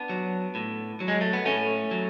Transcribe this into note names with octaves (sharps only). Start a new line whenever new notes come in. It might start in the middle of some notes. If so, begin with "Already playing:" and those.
Already playing: B3 D4
F#3
A2
F#3
G#3
A3
B3
A2 A3 C#4
F#3